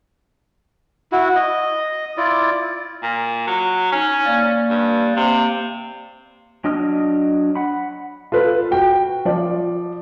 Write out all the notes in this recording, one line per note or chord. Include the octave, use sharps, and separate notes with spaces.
E4 F#4
D#5
E4 F4 D5
A#2
F#3
C#4 D#4
A#3 D5
G2
C3 A#3
F#3 D4 D#5 D#6 F6
F#5 B5
F4 A4 B4
F#4 G5
F3 D5